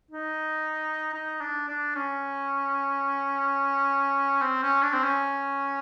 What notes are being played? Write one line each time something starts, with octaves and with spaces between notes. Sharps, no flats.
D#4
D#4
D4
D4
C#4
C4
C#4
D4
C4
C#4